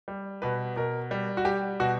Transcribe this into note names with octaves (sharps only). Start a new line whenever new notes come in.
G3
B2 B4
B2 A#4
G3
F#4
G3 G4
B2 F#4